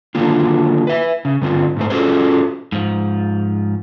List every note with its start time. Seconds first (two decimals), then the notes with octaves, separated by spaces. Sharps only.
0.15 D3 D#3 F#3 A#3 F4
0.87 B4 E5
1.25 C#3
1.41 G2 D3 C4 F4
1.77 G#2 A3 C5
1.90 C#4 F4 F#4 G#4 A4 C5
2.72 G#2 F3